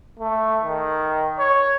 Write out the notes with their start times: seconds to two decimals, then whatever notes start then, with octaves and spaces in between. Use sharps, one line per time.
0.20 A3
0.64 D#3
1.39 C#5